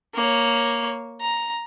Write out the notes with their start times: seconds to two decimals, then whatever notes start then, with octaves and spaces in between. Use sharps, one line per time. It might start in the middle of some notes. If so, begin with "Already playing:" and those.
0.15 A#3 C#5
1.21 A#5